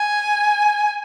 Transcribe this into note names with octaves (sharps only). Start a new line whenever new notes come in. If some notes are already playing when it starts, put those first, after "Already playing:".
Already playing: G#5